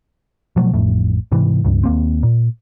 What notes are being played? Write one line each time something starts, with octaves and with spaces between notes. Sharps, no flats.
B2 F3 F#3 A3
A1 F2 A2
G#2 C3 E3
C#2 G2
D#2 A#3 C4
A#2